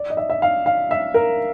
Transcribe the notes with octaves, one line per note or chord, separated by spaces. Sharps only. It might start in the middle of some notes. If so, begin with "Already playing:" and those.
Already playing: D5
D#5
E5
E5
F5
F5
E5
A#4